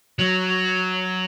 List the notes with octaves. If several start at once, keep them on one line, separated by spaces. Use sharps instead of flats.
F#3